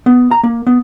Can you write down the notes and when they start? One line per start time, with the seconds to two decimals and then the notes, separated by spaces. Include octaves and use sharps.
0.06 B3
0.31 A#5
0.44 A#3
0.67 B3